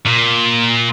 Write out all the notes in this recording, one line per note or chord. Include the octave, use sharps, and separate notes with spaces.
A#2